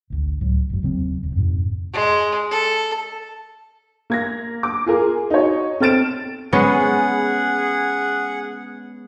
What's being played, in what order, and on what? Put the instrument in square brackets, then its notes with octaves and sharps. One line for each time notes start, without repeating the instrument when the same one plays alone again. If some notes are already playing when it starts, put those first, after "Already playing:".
[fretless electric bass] G#1 D2
C#2 A2 F#3
F#1 F#2
D#2 C#3 F#3 C4
D#1
F2 G#2 B2 C4
[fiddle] G#3
A4
[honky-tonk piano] A#3 G#6 A#6
D6
F4 G#4 A#4
D#4 F#4 C#5
C4 A4 F6 A6 D7 E7
[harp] G#3 B3 C#4 [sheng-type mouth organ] G#4 F#5